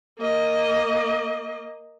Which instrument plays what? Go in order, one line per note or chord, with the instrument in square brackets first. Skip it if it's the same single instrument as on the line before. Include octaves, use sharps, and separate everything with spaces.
[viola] A#3 D#5